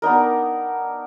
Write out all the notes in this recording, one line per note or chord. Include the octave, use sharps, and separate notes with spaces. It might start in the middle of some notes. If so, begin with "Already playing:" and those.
B3 D4 D#4 A#4